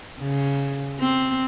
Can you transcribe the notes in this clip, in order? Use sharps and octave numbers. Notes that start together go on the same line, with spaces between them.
C#3
C4